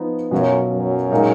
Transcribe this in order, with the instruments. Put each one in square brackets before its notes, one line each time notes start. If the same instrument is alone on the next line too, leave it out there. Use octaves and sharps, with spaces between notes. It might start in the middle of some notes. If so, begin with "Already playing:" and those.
Already playing: [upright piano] F3 B3 D#4
[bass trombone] F#2 [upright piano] B2 F#3 C#4 F4
[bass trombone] F#2
[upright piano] A#2 G#3 D#4 A#4